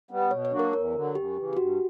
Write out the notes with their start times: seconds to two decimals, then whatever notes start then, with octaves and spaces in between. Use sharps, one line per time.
0.11 G3 B3
0.31 B2 C#5
0.45 C#5
0.52 F#3 A#3 D4 F#4
0.59 A#4
0.73 E2 A#4
0.94 D3 F#3
1.15 F#2 G4
1.36 C#3 E3
1.53 G4
1.57 G2 F#4